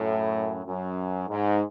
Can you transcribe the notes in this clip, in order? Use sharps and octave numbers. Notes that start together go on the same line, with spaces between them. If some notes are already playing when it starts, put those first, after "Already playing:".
Already playing: F#2 A2
F#2
G#2